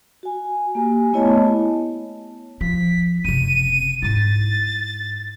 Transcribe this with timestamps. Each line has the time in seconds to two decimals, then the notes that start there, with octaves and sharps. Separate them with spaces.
0.23 F#4 G#5
0.75 A#3 G4 G#5
1.13 A3 B3 E4 C#5 D#5 A5
2.61 F3 B6
3.25 F#1 C3 D#7
4.02 G#2 E4 A6